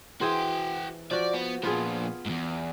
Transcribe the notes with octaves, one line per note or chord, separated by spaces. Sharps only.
E3 F#4 G#4 C5 G5
F3 F#4 D5
B3
A#2 F3 B3 F4 G#4
E2 G#2